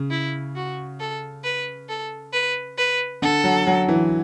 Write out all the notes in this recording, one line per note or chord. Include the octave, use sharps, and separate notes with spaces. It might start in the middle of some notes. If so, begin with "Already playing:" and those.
Already playing: C#3
E4
F#4
A4
B4
A4
B4
B4
D3 A4
F#3
F#3
E3